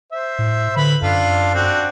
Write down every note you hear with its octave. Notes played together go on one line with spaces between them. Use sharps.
C5 E5
A2
D3 B4 B5
F#2 D4 F4 A4
C4 D4 F#4